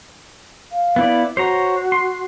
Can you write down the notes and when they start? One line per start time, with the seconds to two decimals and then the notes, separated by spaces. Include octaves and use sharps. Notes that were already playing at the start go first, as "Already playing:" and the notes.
0.72 F5
0.96 B3 E4 D5
1.37 F#4 C5 C#5 A#5
1.92 C6